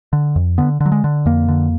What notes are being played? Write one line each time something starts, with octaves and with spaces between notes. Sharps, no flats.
D3
F2
D3 B3
D3
F#3
G#3
D3
F2 A#3
D3